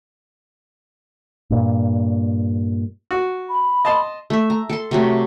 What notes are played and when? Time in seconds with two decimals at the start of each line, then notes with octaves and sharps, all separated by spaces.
1.50 G2 A#2
3.11 F#4
3.50 B5
3.85 D#5 A5 C6
4.30 A3 E5
4.50 A#5
4.70 A4 C6
4.91 C3 F#3 A3